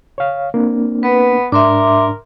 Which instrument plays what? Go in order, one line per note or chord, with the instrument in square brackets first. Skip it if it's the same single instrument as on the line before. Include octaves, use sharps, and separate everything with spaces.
[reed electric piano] C#5 F5
A#3 C4 D4
[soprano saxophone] B3 [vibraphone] B4
[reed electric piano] G#2 D4 [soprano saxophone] A#4 [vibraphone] E5 C6 D6